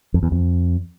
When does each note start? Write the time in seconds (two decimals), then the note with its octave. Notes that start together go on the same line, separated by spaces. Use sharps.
0.14 F2
0.23 E2
0.32 F2